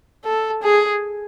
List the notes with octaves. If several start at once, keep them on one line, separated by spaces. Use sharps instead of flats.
A4
G#4